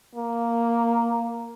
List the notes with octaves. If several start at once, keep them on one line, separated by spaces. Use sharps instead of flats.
A#3